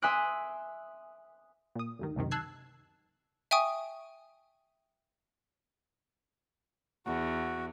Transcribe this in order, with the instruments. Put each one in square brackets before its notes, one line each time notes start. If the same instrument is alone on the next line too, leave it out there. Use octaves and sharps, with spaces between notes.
[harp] E5 G#5 C6 D#6 F#6 D7
[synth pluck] A#2 D#6
D2 G2 D#3
C#2 F#2 C3 D#3
A5 E6 F#6 G#6 C7
[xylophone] E5 G5 G#5 C#6 D#6
[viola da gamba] E2 [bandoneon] F#4